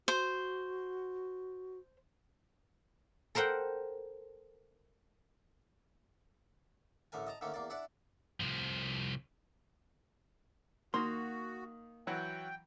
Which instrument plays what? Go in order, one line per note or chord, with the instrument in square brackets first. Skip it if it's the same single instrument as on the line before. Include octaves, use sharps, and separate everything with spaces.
[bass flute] F#4 [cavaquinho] C5
[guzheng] A4 A#4 C5 F#5 G5
[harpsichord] A1 D3 A3 A#4 G#5
D#5 A5 A#5
D3 D#3 A3 A#3 C#4
E2 A#3 D5
D4 E4 D5 F#5
[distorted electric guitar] C2 F3
[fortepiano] D#3 [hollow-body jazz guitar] A#3 [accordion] F#4 [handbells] C6
[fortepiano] E3 F#3 F#4 [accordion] G5